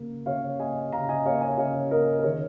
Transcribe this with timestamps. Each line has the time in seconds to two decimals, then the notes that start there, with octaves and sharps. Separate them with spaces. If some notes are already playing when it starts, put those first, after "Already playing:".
Already playing: C#3 A#3 A#4
0.26 C#3 C#5 F5
0.60 A#3 D#5 G#5
0.92 C#3 F5 A#5
1.09 D#5 G#5
1.25 A#3 C#5 F5
1.41 D#5 G#5
1.58 C#3 C#5 F5
1.91 A#3 A#4 D#5
2.19 A#4
2.23 D#3 G#4 C#5